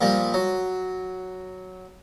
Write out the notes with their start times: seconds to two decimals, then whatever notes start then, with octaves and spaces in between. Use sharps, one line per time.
0.01 A#2 F3 G3
0.34 F#3